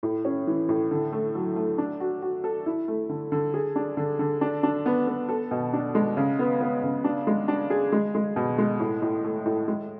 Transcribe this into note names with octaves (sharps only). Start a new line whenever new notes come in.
A2
C#4
E3
A2
D3
A3
F#3
A3
D4
F#4
F#4
A4
E4
A3
D3
D3
G#4
D4
D3
D3
D4
D4
B3
B3
A4
B2
D4
G#3
C#3
B3
B3
C#3
D4
G#3
D4
G#4
G#3
G#3
B2
G#3
A2
A2
A3
A2
G#3